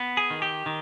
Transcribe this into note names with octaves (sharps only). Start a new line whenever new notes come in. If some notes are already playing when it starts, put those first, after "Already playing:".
Already playing: B3
G#4
D#3
G4
D#3